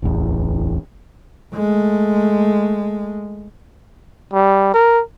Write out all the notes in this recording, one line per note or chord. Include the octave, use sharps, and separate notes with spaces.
D1 A1 E2
G#3 A3
G3
A#4